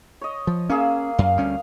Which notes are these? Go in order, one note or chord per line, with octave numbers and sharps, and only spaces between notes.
C#5 D#5
F3
A#3 C#4 G#4 E5
F#2 F5
D2 G3 C#4